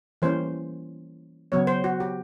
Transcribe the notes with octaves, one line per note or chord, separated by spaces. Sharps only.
E3 G3 A#3 C#4 C5
C#3 F#3 B3 C#5
C5
F#4
G4